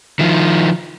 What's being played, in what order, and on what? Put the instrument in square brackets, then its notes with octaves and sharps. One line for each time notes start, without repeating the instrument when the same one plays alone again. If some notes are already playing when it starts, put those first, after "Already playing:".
[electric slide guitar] D#3 F3